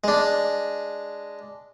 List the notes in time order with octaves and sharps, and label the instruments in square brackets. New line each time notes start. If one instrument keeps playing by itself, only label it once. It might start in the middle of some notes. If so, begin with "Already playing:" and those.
[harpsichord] G#3 D4